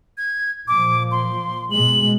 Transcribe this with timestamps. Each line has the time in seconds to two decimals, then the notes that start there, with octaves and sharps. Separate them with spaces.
0.18 G#6
0.68 A#2 F3 D6
1.12 C6
1.71 B2 G#3 F#7